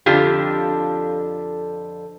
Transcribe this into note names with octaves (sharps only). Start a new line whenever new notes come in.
F2 D3 D4 F4 G4